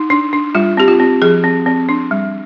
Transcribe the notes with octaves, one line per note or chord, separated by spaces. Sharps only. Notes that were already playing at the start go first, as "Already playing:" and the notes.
Already playing: D#4
D4
D4
G3 F4
C4 G4
F4
C4
F3 G#4
C4
C4
D4
G3